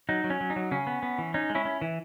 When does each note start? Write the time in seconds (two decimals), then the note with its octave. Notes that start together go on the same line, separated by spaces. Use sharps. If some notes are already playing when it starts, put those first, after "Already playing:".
0.09 F#3 D#4
0.24 F#3
0.30 C#4
0.41 F#3
0.50 D#4
0.56 F#3
0.71 C#3 C#4
0.87 B3
1.03 B3
1.18 E3
1.34 C#4 D#4
1.50 G#3
1.55 C#4 E4
1.65 C#4
1.82 E3